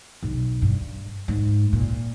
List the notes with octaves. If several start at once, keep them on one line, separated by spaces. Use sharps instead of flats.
B1
G2
G#2
A#2